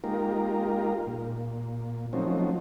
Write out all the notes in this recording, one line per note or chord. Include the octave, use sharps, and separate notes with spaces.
G#3 A#3 D#4 F4 G4 A#4
A#2
F3 F#3 A3 C4 C#4 D#4